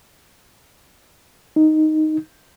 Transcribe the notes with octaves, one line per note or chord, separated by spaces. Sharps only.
D#4